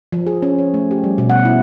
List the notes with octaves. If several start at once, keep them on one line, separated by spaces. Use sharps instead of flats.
F3
G#4
C#4
C#5
A3
G4
G3
B2
F#5
E4